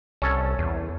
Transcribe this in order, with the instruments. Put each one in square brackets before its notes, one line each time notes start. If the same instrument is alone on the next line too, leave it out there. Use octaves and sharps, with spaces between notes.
[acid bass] C2 [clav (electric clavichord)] C#4 A4
[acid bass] E2